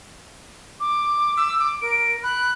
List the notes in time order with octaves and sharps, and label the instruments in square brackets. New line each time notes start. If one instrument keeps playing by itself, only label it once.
[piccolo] D6
[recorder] E6
D6
[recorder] A#4 [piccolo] D7
[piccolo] B5 [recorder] F#6